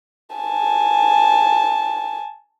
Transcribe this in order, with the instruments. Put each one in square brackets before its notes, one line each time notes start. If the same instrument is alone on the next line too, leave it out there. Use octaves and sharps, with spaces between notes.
[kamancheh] G#5 A5